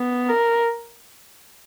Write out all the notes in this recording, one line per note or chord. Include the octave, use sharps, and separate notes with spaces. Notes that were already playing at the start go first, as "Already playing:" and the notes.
Already playing: B3
A#4